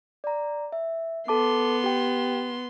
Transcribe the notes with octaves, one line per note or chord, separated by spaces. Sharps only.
D5 A#5
E5
B3 A4 A5 C6 D6
G4 G5